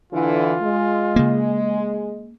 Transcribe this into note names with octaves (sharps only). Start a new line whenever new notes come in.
D3 E3 F4
G#3
C#3 A#3